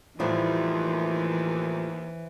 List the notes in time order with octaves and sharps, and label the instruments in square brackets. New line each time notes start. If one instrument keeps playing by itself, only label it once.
[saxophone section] D#2 [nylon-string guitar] A2 F3 G3 [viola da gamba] E3 [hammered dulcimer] E4 C5